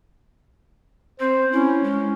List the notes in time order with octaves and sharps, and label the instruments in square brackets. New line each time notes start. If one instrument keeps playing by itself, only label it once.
[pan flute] C4 [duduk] C5
[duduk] C#4 [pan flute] E4
[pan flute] G#3